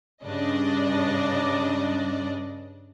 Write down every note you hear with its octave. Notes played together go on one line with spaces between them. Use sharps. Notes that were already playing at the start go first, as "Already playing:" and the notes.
G2 C#3 D4 D5 D#5